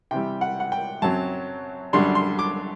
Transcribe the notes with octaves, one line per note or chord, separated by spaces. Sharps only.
C3 E3 G3 G5
F#5
F#5
G5
F#2 F#3 C4 A5
F#2 D3 G3 D4 C6
C6
D6